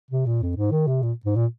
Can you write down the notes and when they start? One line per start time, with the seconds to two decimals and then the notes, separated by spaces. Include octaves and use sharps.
0.11 C3
0.26 A#2
0.42 F2
0.57 G#2
0.71 D#3
0.87 C3
1.02 A#2
1.25 G#2
1.36 A#2